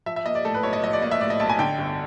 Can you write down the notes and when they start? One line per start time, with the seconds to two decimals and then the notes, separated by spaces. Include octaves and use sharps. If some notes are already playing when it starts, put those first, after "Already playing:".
0.06 F3 E5
0.16 E5
0.26 A#3 D#5
0.35 D5
0.45 A2 A4
0.54 B4
0.63 B1 C#5
0.73 D#5
0.83 F3 D#5
0.93 D5
1.02 A#3 D#5
1.11 E5
1.21 A2 D5
1.30 D#5
1.40 B1 A5
1.49 G#5
1.59 D3 G5
1.78 G1